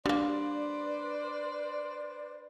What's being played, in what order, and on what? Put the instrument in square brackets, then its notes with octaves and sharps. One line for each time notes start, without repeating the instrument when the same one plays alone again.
[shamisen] G3 A#3 [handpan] D4 [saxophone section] B4 C5 D5